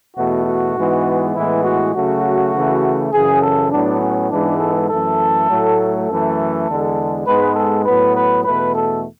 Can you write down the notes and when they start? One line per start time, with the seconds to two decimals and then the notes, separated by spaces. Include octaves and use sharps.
0.16 E2 B2 A3 F#4
0.47 F#4
0.76 G#2 E3 G#3 B3
1.35 A2 E3 G#3 B3 E4
1.64 F#4
1.94 C#3 F#3 A3 F#4
2.53 C#3 E3 A3
3.12 F#2 C#3 E3 G#4
3.43 A4
3.71 A2 F#3 B3 D4
4.01 C#4
4.31 G#2 E3 G#3 B3 D4
4.60 A4
4.90 F#2 E3 A3 A4
5.49 A2 F#3 A3
6.08 F#2 E3 A3 A4
6.67 E2 D3 G#3
7.27 G#2 G#3 B3 B4
7.56 A4
7.85 A2 F#3 B3 B4
8.15 B4
8.45 E2 B2 A3 B4
8.75 A4